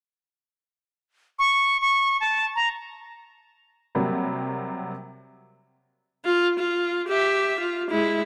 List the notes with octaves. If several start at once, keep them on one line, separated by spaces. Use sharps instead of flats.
C#6
C#6
A5
A#5
C3 F#3 G3 A#3
F4
F4
G4 E5
F4
G#3 E4